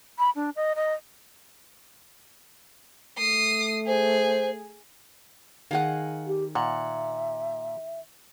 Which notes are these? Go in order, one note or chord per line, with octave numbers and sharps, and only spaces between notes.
B5
D4
D#5
D#5
A3 D#6 C7
G#4 C5
D#3 G#4 D#5 F5 F#5
G4
A#2 E5 F#5